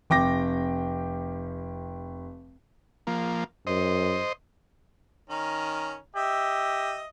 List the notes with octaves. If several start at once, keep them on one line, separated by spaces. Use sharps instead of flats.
F1 G5 D6 A#6
F3 A#3
F#2 C5 D#5
D#3 C#4 A#5
G4 D#5 E5